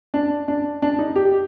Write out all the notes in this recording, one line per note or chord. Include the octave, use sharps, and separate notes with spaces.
D4
D4
D4
D#4
G4